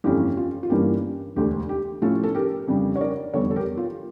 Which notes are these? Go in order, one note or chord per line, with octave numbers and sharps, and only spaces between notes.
G1 F2 E3 A3 C#4 G4
F4
F4
G1 G2 E3 A#3 C#4 G4
E1 D2 D3 A3 G4
G4
A2 F3 A3 C#4 F4 A4
A4
G4 A#4
F2 C#3 G3 D4
C#5
A#4 D5
F1 E2 D3 G3 A4 C#5
A4
G4 A#4
F4